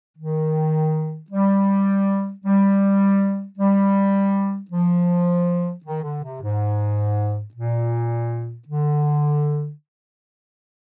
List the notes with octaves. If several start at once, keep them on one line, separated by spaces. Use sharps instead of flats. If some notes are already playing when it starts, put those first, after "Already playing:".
D#3
G3
G3
G3
F3
D#3
D3
C3
G#2
A#2
D3